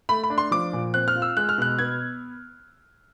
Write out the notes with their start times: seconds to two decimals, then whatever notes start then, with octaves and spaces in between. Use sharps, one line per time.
0.09 A3 B5
0.23 B5
0.30 D4
0.38 C6
0.51 F3 D6
0.73 A#2
0.94 C4 F#6
1.08 F6
1.16 F4
1.22 E6
1.37 G#3 F#6
1.49 F6
1.58 B2 F#6
1.79 B3 G#6